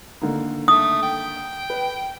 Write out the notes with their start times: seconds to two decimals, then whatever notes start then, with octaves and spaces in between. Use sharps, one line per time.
0.21 D3 D#3 A#3
0.68 A3 D#6
1.03 G5
1.70 B4